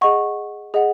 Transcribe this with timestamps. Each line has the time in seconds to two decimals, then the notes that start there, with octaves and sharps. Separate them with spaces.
0.01 G#4 D#5 F#5 C#6
0.74 G#4 D#5 F#5